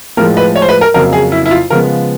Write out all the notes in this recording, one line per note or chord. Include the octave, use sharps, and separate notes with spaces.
A2 F3 G#3 A#4
B4
C#5
C5
B4
A#4
F2 C#3 F#3 A#3 A#4
G#4
E4
E4
F4
C#3 F3 G#3 B3 A#4